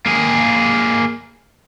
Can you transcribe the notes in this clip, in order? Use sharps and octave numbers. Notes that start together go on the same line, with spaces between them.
A#3 G#4